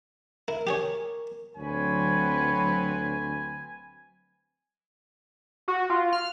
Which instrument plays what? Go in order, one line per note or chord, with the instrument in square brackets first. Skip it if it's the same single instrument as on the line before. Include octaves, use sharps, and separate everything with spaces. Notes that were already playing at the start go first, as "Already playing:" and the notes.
[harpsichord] E4 [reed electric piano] A#4
[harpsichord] G4 G#4 C#5
[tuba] D2 [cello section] F#3 C4 B4 [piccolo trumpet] C#5 [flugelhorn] G#5
[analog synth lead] F#4
F4
F6